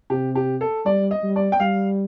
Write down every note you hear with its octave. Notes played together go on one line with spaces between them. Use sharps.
C3 G4
G4
A4
G3 D5
D#5
G3
D5
G5
G3 F5